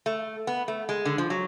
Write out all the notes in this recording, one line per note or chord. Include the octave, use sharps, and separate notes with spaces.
A3
B3
A3
G#3
D3
F3
F#3